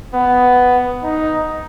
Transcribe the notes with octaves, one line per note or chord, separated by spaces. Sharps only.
B3
D#4